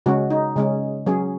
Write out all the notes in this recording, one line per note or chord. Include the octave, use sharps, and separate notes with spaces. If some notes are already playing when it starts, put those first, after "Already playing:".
C#3 G#3 C#4 F#4
D#4
C#3 G#3 C#4
F#3 C#4 G#4